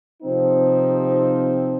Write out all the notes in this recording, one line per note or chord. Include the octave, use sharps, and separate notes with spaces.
C3 F3 C4 D#4